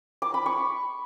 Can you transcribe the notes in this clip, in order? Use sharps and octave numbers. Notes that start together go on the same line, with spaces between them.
D6
B5
C#6